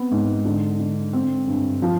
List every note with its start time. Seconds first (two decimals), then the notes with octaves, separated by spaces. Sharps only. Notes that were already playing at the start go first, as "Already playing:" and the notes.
Already playing: B3 C4
0.11 G#2
0.45 D3
0.79 D3
1.13 C4
1.47 G2
1.82 F3